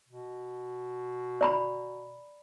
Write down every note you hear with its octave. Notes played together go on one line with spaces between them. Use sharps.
B2
D5 A#5 B5